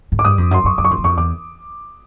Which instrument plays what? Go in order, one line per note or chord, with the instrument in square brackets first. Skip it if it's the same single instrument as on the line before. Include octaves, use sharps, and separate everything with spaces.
[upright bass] G#2
[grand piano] D6
[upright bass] G2 [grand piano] D#6
[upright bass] F2
[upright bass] F#2 [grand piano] C6
[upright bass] F#2 [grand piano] C#6
[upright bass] F#2 [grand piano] D6
[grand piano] C#6
[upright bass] F2 [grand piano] C6
[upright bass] F#2
[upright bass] F2 [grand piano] C#6
[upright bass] E2 [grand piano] D6